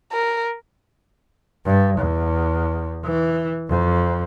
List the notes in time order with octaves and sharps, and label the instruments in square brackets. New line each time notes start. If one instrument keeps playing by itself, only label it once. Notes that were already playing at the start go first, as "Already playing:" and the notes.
[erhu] A#4
[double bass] G2
E2
E3
F2